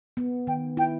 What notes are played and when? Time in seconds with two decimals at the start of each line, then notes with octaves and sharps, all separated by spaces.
0.17 B3
0.47 D#3 G5
0.77 E4 G5